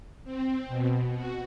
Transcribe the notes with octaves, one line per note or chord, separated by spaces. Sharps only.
C4
B2
F#4